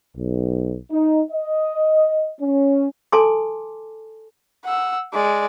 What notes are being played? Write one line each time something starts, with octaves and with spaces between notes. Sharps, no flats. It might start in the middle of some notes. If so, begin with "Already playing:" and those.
B1
D#4
D#5
C#4
A4 G#5 A5 C6 D6
F#5 E6
G#3 D5